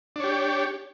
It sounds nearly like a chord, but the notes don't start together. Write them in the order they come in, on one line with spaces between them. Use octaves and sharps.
D4 C#5 G4